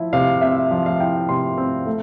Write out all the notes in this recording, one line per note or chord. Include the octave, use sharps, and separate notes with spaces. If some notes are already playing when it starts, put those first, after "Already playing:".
Already playing: F3 E4
C3 F5
C4 E5
F3 E5
F5
E4 G5
C3 C6
C4
A3